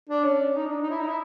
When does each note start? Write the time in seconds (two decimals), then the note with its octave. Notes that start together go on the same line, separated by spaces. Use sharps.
0.09 D4
0.24 C#4
0.55 D#4
0.66 D4
0.82 D#4
0.90 E4
0.99 D#4
1.08 E4